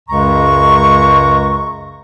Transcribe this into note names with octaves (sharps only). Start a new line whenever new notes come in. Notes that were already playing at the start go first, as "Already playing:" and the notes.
C#2 F#2 C#3 G#3 A#5 C#6